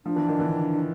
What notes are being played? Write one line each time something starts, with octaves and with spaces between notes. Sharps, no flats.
F3 D4
E3
D#3
D3 E3